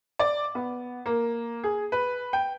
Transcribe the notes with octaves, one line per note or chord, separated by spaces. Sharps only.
D5
B3
A#3
G#4
B4
G5